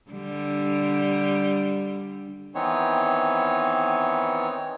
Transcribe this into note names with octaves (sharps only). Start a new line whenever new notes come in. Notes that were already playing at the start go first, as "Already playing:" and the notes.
D3 G3
D#3 E3 B3 C4 D#4 C#5